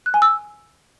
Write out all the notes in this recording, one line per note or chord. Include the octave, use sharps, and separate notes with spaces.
F#6
G#5
E6